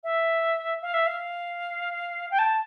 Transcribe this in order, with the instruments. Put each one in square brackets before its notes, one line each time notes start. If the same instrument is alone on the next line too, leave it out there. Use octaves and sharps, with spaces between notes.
[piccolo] E5
F5
E5
F5
G5
A5